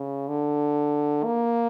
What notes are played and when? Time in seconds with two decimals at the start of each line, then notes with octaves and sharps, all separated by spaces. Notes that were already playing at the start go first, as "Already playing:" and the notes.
Already playing: C#3
0.28 D3
1.24 A#3